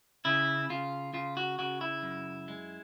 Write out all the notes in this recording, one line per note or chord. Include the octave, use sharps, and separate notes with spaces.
C#3 E4
C#3 F4
C#3 F4
F#4
C#3 F#4
E4
F#2
G#3